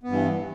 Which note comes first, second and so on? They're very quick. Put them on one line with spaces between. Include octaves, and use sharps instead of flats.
B3 G2 E3